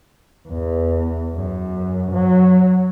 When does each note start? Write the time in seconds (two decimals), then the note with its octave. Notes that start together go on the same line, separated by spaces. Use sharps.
0.49 E2
1.36 F#2
2.13 F#3